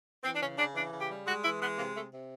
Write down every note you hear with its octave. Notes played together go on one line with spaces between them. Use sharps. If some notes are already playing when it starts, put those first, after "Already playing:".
E3 C4
D4
C#3 C#4
C#3 D4
E3 D4
C#3
G4
G3
G#3 F#4
E3 E4
G#3 B3
C3 A#3
C3 A3
C3